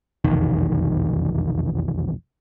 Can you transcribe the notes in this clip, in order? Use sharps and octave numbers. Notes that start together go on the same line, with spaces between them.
F1 B1 E2 D#3